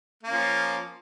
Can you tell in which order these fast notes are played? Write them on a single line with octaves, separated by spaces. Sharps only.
A#3 C#4 F3